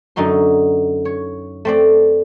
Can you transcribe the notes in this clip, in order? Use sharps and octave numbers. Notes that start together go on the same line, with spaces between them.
F#2 D3 D#4 F#4 C6
C#5
A3 C4 D5